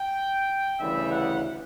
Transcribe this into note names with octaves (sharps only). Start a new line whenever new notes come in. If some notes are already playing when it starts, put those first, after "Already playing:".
Already playing: G5
D2 C#3 E3 G3 E5
F#5